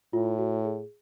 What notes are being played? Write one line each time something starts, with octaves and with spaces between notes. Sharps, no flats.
A2 F4
F#4
G#4